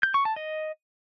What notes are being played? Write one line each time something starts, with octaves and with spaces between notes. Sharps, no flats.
G6
C#6
A5
D#5